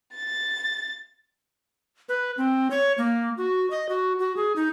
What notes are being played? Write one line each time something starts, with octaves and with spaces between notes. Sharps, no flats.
A6
B4
C4
C#5
A#3
F#4
D#5
F#4
F#4
G#4
D#4